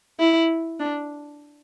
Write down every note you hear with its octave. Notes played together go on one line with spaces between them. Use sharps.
E4
D4